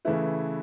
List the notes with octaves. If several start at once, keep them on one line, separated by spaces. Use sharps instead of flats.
C#3 E3 A3 E4 B4